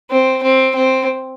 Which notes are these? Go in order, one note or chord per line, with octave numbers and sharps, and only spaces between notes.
C4
C4
C4